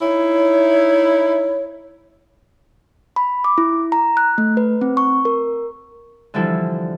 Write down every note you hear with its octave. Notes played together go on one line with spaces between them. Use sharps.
D#4 E4 C#5
B5
D6
E4
A#5
F#6
A3
B4
C4
C#6
A#4
D3 E3 F3 G3 E4 A4